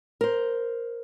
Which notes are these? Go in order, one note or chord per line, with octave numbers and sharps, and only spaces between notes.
A#4 C5